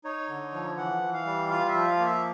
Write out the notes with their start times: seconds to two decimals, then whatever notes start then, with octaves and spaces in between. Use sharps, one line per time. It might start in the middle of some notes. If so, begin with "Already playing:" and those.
0.04 D#4 C#5
0.29 D3
0.53 F3
0.77 E3 F#5
1.02 E3
1.13 F5
1.26 G3
1.50 F4 F5
1.69 E5
1.75 F3
1.87 F5
1.99 A#3
2.05 E5